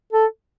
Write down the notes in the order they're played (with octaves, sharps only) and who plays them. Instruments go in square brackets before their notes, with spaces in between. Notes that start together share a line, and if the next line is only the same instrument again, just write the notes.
[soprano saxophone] A4